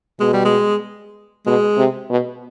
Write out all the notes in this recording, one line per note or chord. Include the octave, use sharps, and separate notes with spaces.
B2 G#3
G3
G#3
B2 G#3
C3
B2